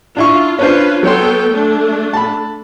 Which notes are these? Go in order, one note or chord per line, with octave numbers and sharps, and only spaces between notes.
D4 E4 F4 C#6
C#4 D4 F4 B4 C5
F#3 B3 A4 C#5 G5 C6
A3 D4
A5 B5